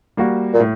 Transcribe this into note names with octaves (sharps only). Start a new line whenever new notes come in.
G3 A#3 F#4
A#2
A2